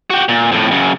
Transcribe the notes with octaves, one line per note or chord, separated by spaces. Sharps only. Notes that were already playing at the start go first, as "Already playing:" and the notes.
F#4 G4
A#2
F2 A2
F#2 C#3